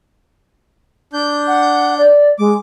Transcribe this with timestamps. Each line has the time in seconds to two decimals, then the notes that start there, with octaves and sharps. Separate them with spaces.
1.13 D4 G6
1.47 F#5
1.98 D5
2.38 G#3 D6